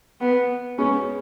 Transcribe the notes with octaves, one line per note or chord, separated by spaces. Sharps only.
B3
G#3 B3 C#4